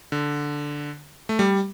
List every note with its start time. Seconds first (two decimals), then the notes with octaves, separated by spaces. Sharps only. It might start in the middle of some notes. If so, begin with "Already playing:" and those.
0.12 D3
1.29 A3
1.39 G3